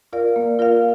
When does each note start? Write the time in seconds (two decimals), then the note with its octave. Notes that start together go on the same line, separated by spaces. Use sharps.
0.13 F4 A#4 D5 F5
0.36 A#3
0.59 F4 A#4 D5 F5